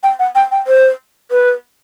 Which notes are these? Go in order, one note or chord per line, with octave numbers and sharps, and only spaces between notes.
G5
F#5
G5
G5
C5
B4